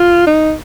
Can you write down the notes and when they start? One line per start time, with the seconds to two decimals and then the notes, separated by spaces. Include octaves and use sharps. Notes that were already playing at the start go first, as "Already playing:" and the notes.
Already playing: F4
0.27 D#4